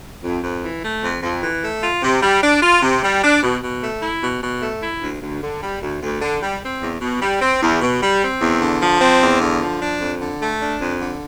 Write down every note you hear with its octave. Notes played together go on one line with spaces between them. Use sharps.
F2
F2
E3
A3
F2
F2
E3
A3
F4
C3
G3
D4
F4
C3
G3
D4
B2
B2
A3
E4
B2
B2
A3
E4
D2
D2
D3
G3
D2
D2
D3
G3
C4
E2
B2
G3
C4
E2
B2
G3
C4
E2
D3
F3
C4
E2
D3
F3
D4
F2
D3
A3
D4
F2
D3